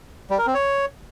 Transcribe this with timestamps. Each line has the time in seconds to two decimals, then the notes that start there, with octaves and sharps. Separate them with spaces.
0.30 G3
0.38 A#4
0.46 C4
0.54 C#5